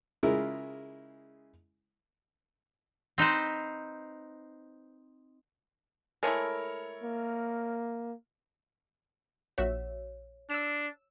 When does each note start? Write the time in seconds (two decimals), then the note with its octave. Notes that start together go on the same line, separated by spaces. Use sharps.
0.23 C#3 G#3 E4 F4 A#4
3.18 C4 D#4 B4 C5
6.23 G#3 A3 E4 A4 A#4 C#5
7.03 A#3
9.58 A#1 F#4 C#5 E5
10.50 D4 E6 E7